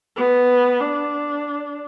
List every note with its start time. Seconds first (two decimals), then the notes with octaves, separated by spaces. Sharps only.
0.16 B3
0.81 D4